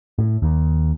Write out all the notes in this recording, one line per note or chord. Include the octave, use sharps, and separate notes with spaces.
A2
D#2